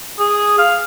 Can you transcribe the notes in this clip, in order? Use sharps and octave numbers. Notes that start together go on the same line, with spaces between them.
G#4
F5